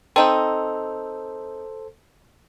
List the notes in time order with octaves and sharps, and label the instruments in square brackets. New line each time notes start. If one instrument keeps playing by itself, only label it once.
[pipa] C4 D#4 [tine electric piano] A4 C5